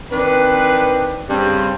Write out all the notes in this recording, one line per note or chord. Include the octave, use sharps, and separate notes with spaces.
D#3 C4 D4 B4
G2 C#3 G3 C4